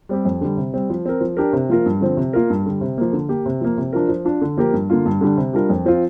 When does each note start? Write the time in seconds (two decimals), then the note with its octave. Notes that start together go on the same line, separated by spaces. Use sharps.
0.09 G3 C4 G4
0.25 F2
0.41 D3 G3
0.57 C3
0.74 G3 C4
0.90 F3
1.06 C4 A#4
1.21 F3
1.37 D4 G4 A#4
1.53 C3
1.69 F3 A#3 F4 A#4
1.86 G2
2.01 D3 F3 C4
2.17 C3
2.33 A#3 F4 A#4
2.50 G2
2.66 D3 G3
2.81 C3
2.97 F3 A#3
3.13 D3
3.29 A#3 G4
3.46 C3
3.61 F3 A#3
3.77 C3
3.93 F3 D4 F4 A#4
4.09 F3
4.25 D4 F4
4.41 D3
4.57 F3 A#3 G4 A#4
4.73 G2
4.90 D3 A#3 F4
5.06 G2
5.21 D3 G3 D4
5.37 C3
5.53 G3 D4 F4 A#4
5.70 F2
5.85 F3 C4 F4